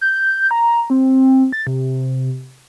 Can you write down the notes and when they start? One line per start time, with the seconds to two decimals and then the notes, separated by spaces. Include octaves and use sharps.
0.01 G6
0.51 A#5
0.90 C4
1.53 A6
1.67 C3